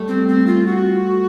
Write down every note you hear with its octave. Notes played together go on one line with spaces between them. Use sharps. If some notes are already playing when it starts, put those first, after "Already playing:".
Already playing: G3 A3
C4
C4
F4
F#4